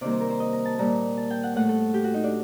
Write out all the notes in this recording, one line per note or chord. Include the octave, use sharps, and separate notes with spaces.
C3 D#3 G3 A#3 D5
C5
A#4
C5
D#5
A#5
A5
A#2 G3 A#3 A#5
A5
G5
F#5
A2 A3 F#5
A4
G4
F#4
D#4
D4